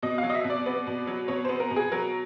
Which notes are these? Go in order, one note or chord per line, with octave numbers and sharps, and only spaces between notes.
B2 D#5
F#3 F5
D#5
E5
B2
D5
B3
B2
F#3
B2 C#5
B3 C5
A#4
B2
G#4
F#3 A#4